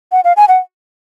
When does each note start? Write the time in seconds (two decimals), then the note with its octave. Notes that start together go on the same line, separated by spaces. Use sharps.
0.12 F#5
0.24 F5
0.37 G#5
0.48 F#5